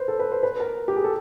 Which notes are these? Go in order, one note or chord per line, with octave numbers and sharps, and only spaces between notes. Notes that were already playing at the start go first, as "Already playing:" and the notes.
Already playing: B4 C5
A4
B4
C5
B4
A#4
G4
G#4
A4